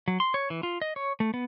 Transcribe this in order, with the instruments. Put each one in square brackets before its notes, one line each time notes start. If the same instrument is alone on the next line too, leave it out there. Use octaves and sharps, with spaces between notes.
[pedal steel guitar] F#3
C6
C#5
E3
F4
D#5
C#5
A3
B3